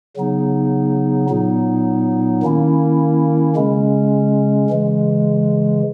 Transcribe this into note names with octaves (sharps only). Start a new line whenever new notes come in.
C#3 F#3 B3 D#4
A#2 F#3 B3 D#4
D#3 A#3 C#4 E4
C#3 G#3 C#4
C#3 E3 G#3